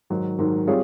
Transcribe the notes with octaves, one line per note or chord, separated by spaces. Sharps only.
G#2 D#3 F#3
G#2 D#3 F#3
G3 C4 F4 G#4 C#5